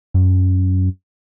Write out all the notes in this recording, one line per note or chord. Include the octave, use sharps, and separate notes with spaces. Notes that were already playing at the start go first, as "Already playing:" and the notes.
F#2